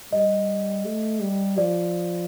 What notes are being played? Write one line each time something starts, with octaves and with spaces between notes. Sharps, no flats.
G3 D#5
A3
G3
F3 D5